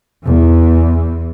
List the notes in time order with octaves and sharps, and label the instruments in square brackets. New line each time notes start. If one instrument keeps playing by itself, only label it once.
[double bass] E2 E3